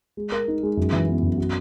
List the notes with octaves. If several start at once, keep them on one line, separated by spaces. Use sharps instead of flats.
G#3
A#4
D#4
G#3
F#2
E3
B3
F#2
F#4